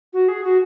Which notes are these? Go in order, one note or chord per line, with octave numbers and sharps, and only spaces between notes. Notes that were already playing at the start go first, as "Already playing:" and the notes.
F#4
G#4
F#4